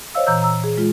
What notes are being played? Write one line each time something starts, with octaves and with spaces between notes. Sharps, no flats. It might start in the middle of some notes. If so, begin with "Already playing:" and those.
C5 C#5 D#5 F5 E6
A#2 E3 A#5 E6 G6
A#5 E6
G#4
G#3 F4